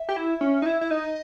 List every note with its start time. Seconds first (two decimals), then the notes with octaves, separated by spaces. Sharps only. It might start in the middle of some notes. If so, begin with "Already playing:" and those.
Already playing: E5
0.09 G4
0.17 E4
0.41 C#4
0.62 D#4
0.66 E4
0.81 E4
0.91 D#4 D#5